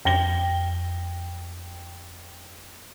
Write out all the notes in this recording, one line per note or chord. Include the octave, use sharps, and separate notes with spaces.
F2 G5 A#6 G7